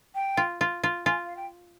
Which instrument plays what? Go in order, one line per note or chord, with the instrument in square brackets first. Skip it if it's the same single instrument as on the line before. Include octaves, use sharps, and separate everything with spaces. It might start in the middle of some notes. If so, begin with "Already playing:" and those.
[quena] G5
[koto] F4
F4
F4
[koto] F4 [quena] G#5
[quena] F5
G5